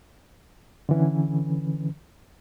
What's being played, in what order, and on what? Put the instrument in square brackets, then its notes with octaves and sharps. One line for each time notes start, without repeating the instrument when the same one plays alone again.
[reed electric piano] D3 E3 C#4